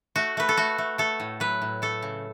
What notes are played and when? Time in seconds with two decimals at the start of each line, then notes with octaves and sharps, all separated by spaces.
0.16 A3 F#4
0.37 A3 B4
0.49 A4
0.57 A3 F#4
0.78 A3
0.98 A3 A4
1.20 A2
1.40 F#3 B4
1.62 A2
1.82 A3 A4
2.02 C#3